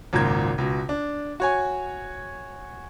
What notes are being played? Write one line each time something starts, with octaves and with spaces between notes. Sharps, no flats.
G#1 C#2 A#2 A#4 G#6
C#2 B2
D4
F#4 C#5 G#5